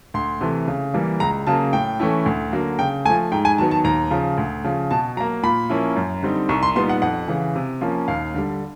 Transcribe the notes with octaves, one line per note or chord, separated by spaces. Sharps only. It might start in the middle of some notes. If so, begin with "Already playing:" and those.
D2 C6
C3 E3 A3
C#3
E3 G3 A#3
C#2 A#5
C#3 F#3 A#3 A5
A2 G5
E3 A3 C#4 E4
D2
D3 F#3 A#3
C#3 G5
F3 A3 G#5
G#2 G5
G#5
D#3 F#3 B3 A5
A5
D#2 A#5
C#3 F3
D2
C#3 F3
B2 A5
F#3 A#3 A#5
A#2 B5
F3 A#3 C#4 E4
F#2
D3 G3 C4 D#4
C2 C#6
C6
A#2 G3 B3 D#4 C6
F#5
F2 F#5
C#3 E3
C3
F3 A#3 C#4
D#2 F5
D3 G3